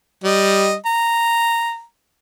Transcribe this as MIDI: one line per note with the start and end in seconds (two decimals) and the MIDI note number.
0.24 0.75 55
0.24 0.75 75
0.86 1.83 82